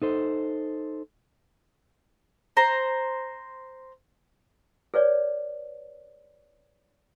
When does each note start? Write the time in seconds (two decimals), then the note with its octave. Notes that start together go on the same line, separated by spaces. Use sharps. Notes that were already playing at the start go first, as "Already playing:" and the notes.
0.02 D#4 A4 C5
2.57 C5 A#5
4.94 G#4 B4 C#5 D5